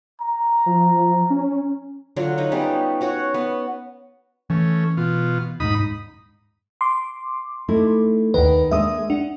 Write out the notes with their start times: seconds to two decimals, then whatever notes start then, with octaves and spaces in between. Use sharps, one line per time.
0.21 A#5
0.66 F3
1.30 C#4
2.16 D3 F#3 F4
2.38 D#4 B4
2.52 G3 B3 C#4
3.01 C#4 F#4 C#5
3.34 B3
4.50 E3 A3 C#4
4.97 B2 F4
5.60 D#1 G#2 D#4 B5 D#6
6.81 C6 D6
7.68 A3 D#4 E4
8.34 D#2 D#3 B4
8.71 G#3 A#3 D4 E5 D#6
9.10 D4 F#5